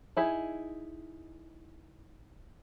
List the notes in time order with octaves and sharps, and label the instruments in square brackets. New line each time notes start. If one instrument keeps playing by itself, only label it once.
[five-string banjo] D#4 E4 G#4